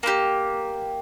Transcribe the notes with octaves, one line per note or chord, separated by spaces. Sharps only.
A#3 E4 G4